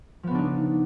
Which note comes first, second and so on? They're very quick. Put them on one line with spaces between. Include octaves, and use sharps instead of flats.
F3 B3 C#3 D4 D#4